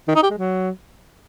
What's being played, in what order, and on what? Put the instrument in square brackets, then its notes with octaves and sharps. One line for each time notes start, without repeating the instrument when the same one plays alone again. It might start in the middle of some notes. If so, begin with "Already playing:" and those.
[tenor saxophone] D#3
D#4
G4
G#3
F#3